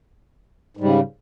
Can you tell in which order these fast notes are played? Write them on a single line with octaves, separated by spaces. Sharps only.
G#2 G3 C#3